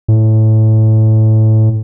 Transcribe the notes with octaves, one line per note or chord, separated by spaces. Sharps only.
A2